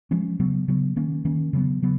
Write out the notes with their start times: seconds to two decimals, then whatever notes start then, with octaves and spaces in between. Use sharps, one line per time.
0.11 F3 G#3 C#4
0.40 C#3 F#3 B3
0.68 C#3 F#3 B3
0.96 D#3 A#3 C#4
1.25 D#3 A#3 C#4
1.53 C#3 F#3 B3
1.82 C#3 F#3 B3